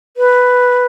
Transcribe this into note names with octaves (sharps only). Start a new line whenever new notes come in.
B4